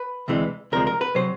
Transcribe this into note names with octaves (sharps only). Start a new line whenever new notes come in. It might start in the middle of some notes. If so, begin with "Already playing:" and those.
Already playing: B4
D2 C3 E3 G#3
D2 C3 F3 G#3 A#4
A#4
B4
C3 F#3 C5